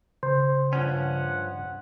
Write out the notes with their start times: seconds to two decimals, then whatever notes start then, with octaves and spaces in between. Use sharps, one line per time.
0.23 C#3 C5
0.73 G2 F3 C#4 F#5